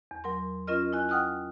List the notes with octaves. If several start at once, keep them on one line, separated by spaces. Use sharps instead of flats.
E2
F#3 A#4 C6
C#4 F4 A#4 D#5 F6
E4 D#5 G#5 F#6
F#5 G5 D#6 F6 F#6